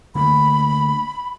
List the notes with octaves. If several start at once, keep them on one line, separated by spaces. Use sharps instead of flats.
D3 A3 A#3 B5